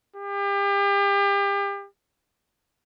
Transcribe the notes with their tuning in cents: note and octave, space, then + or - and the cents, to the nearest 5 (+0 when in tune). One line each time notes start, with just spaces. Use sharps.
G4 +35